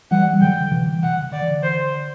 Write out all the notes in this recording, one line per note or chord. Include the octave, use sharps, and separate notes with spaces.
E3 G3 F#5
G3
D3 F#3 G5
C3 E3
C3 F#5
D3
D3 D5
E3
D3
C5